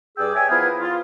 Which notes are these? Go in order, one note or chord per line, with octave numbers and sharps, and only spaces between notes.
G2 G#4 D5 G5 E6
C#5 E5 G5 G#5
F3 B3 E4 G#4 A#4 B4
F4